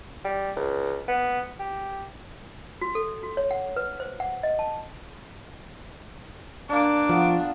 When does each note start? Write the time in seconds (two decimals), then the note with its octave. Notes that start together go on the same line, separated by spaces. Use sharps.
0.25 G3
0.57 C#2
1.08 B3
1.60 G4
2.81 F#4
2.95 A4
3.23 F#4
3.37 C#5
3.51 F#5
3.76 B4
4.00 C5
4.20 F#5
4.43 D#5
4.59 A5
6.69 A#3 D4 D5 D6
7.09 F3 A3 B3 F4